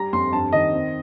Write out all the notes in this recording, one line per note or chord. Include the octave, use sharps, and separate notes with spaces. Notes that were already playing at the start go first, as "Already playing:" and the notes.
Already playing: G3 A#5
F2 C6
G2 A5
D#3 D#5
C4